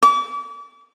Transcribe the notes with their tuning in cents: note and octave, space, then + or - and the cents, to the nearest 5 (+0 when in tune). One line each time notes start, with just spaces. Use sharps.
D6 -40